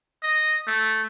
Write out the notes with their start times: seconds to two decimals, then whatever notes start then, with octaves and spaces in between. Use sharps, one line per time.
0.22 D#5
0.67 A3